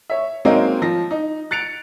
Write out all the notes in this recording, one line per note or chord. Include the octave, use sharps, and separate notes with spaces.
C#5 E5
F#3 G#3 A#3 C4 C#4 D#4
F3 A#6
D#4
F#6 A6 C#7 D7 F7